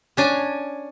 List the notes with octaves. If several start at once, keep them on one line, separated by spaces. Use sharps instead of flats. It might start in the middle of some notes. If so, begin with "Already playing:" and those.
C#4 D4 G#5